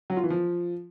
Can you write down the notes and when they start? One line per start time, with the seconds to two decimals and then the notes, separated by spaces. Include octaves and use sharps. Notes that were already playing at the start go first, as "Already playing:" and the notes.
0.10 F#3
0.17 F4
0.23 E3
0.30 F3